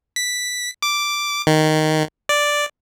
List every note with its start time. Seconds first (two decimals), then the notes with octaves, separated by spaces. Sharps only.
0.16 B6
0.82 D6
1.47 D#3
2.29 D5